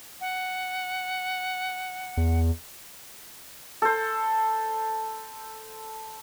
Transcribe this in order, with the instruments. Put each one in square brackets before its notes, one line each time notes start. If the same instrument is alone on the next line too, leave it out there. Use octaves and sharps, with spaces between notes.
[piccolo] F#5
[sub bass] E2
[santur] A4 C5